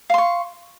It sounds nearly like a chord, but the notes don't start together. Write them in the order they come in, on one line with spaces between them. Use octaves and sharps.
F5 C6 C#6